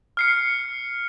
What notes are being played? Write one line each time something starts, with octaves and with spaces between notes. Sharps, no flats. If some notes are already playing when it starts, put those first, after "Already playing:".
F6 C7 C#7